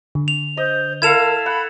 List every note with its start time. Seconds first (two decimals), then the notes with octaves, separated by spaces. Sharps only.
0.15 D3
0.28 F7
0.57 C5 D#5
1.02 E4 A4 A#4 F5 G#6 E7 F7
1.46 F#5 B5